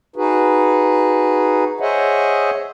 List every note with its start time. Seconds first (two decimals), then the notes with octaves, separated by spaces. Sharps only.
0.16 D#4 F#4 G#4 B4
1.80 G#4 C5 C#5 D#5 E5 F#5